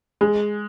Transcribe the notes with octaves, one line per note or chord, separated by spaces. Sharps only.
G#3